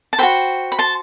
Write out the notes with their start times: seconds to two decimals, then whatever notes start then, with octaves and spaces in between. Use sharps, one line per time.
0.13 A5
0.19 F#4 A4 C5 G5 B5
0.72 B5
0.79 A5 C6